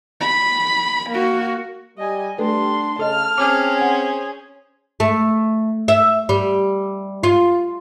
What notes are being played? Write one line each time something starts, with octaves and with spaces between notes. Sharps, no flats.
B5
A#3 F#4
G3 D#5 G#5
G3 A3 D4 A4 B4 C6
C#3 A4 D#5 A5 F6
C4 C#4 G#4 D6
C5 F#5
A3
E5
G3
F4